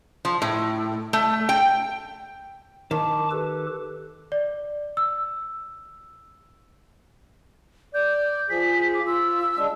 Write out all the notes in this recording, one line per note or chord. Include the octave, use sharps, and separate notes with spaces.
F3
A2
A3
G5
D#3 A5 D6
G4 A4 B4
D5
E6
D5 G6
F3 G#4 B6
D6
F4 E6
G#3 D4